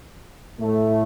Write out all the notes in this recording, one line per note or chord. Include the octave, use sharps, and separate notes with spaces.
A2 A3